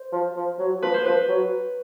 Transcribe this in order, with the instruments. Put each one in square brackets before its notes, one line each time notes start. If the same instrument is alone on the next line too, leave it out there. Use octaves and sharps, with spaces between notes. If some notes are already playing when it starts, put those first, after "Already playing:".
Already playing: [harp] C5
[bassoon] F3
F3
F#3
[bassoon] F3 [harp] B4
[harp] C5
[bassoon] F3 [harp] B4
[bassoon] F#3